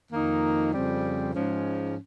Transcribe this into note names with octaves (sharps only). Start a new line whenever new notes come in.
F2 D#3 A#3 D#4
F2 C#3 G3 C4
G#2 F3 G#3 C#4